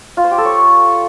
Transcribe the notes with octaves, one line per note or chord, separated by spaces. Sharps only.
F4
C5
G4
A4
C#5